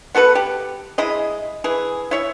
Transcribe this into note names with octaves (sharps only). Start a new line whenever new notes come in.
B3 F#4 A4 B4
G4
G#3 E4 G#4 D#5
E3 G#4
E4 C#5 E5